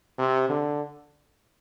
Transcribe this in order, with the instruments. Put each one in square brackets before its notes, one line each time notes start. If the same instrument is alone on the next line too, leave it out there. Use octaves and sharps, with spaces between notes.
[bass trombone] C3
D3